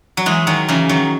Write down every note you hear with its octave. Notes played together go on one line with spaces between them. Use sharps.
F#3
E3 G#3
D#3 F#3
C#3 E3
D#3 F#3